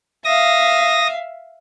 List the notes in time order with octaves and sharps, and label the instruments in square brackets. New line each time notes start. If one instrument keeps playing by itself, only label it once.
[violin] E5 F5 [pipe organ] D#6 A#6